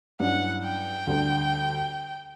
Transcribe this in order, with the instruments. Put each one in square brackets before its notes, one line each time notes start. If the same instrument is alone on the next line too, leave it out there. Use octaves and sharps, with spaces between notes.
[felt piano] G2 F#3 C#4 E4 [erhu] F#5
[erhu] G5
[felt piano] D2 D3 G3 D4